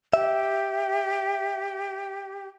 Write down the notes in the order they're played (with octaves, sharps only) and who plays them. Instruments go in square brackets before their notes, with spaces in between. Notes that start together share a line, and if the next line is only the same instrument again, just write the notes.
[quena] G4 [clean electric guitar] E5